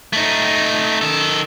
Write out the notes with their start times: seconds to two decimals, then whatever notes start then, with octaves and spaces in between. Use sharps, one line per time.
0.13 A3 D#4
1.01 D#3 A4